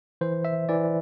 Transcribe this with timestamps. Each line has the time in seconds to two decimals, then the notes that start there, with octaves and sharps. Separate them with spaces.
0.21 E3 C5
0.45 E5
0.69 E3 D5